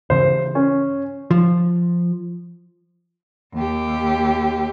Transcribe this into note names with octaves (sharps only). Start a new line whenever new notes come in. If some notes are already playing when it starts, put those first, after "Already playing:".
G2 C#3 E3 C5
C#4
F3
D#2 G4